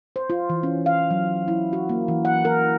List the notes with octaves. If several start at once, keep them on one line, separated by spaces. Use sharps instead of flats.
C5
F4
E3
C#4
F5
F#3
E4
F#4
A#3
E3
F#5
A#4